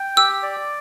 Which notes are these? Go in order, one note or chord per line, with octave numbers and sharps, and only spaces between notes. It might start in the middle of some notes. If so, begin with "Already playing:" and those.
Already playing: G5
G4 E6
D5